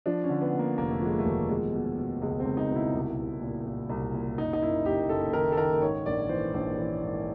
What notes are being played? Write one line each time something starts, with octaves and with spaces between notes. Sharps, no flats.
F3 D4
C#4
D3
B3
D3 A#3
F1 A#3
A3
F3 G#3
A3
D#2
B2 G#3
B2
B2
C#2 G#3
C4
C#2
D#4
B2
E4
C2
C2
A#2
A#2
C2
A#2
F#1 D#4
D#4
F#1 E4
F#1 G4
F#1 A4
D#3 A#4
A4
D#3 A#4
G#2 C#5
A#1 D5
E3 C5
A#1 C5
E3
G#2